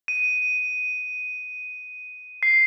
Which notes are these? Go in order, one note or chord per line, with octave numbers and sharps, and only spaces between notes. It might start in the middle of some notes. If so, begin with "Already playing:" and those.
D#7
C7